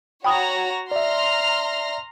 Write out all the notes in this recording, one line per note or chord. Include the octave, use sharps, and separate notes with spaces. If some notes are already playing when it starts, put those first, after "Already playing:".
F#4 C#5 G5 A#5 B5 D#6
D5 E5 A#5 C6 F6